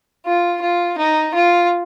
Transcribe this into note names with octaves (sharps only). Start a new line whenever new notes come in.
F4
F4
D#4
F4